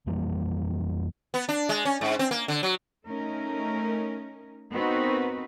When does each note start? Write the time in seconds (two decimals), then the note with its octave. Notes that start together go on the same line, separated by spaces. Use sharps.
0.06 F2 E3 G3 A#3
1.34 B3
1.49 D4
1.69 G#3
1.85 C#4
2.01 G#2
2.19 C4
2.31 A#3
2.48 D3
2.63 F#3
3.07 A3 C#4 D#4 A#4
4.72 B3 C4 D#4 F#4 A#4 B4